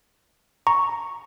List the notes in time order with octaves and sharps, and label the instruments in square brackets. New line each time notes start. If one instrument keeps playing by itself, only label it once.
[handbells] A#5 C#6